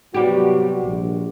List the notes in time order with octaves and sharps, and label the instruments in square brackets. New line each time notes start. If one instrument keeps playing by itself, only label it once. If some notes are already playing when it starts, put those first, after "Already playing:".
[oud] C3 G3 G4 [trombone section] F#3 B3 F#4
[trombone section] A#1